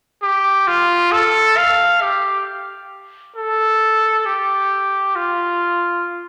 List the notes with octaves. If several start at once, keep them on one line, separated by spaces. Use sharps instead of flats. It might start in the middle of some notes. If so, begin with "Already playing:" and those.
G4
F4
A4
F5
G4
A4
G4
F4